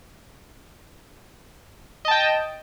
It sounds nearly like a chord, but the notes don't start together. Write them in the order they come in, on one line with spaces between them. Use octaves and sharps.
D#5 A5 G5